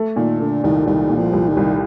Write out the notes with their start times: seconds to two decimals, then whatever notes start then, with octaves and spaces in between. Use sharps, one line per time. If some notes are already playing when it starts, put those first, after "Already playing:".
Already playing: A3
0.16 A#2 D#3
0.40 D3 A3
0.64 C2 D#3
0.87 C2 D#3
1.10 A#2
1.18 F3
1.33 C2
1.49 D#3
1.57 C2